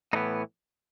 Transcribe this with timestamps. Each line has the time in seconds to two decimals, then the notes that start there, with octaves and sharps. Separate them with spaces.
0.13 A2 E3 B3 D#4